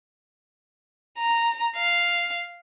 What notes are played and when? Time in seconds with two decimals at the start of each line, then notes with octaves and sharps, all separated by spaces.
1.19 A#5
1.76 F5